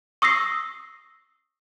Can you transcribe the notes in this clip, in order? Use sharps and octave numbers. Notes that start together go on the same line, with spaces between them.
C#6 D#6 E6 A#6 C7